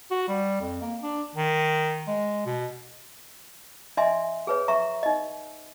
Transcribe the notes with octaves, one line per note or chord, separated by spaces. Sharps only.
F#4
G3
F2
A#3
D4
D#3
G#3
B2
D4 D#5 E5 G#5 C6
G#4 B4 C#5
E5 A#5 C#6
D#4 D#5